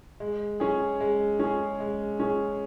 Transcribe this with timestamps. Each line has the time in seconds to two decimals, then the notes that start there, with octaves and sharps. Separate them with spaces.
0.20 G#3
0.60 C#4 G#4
1.00 G#3
1.40 C#4 G#4
1.80 G#3
2.20 C#4 G#4